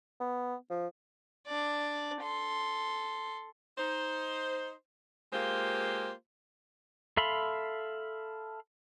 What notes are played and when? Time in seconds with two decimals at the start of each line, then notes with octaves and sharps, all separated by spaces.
0.20 B3
0.70 F3
1.47 D4 D5
2.22 A4 C6
3.78 D#4 C5
5.33 G#3 A#3 F4 G4 C5
7.17 A4 E5 F5 B5 C6